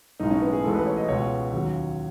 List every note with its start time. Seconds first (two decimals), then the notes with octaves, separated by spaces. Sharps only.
0.20 B1 A2 G#3 D#4
0.31 C#4
0.42 B3
0.53 G#4
0.64 A1 A2 G#3 A4
0.75 B4
0.86 C#5
0.97 D#5
1.08 C#2 B2 G#3 C#5
1.52 D#2 C#3 F#3